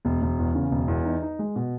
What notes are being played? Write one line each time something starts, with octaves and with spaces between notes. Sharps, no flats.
E1
E1
E2
C#3
E1
E2
D#4
D#4
G#3
B2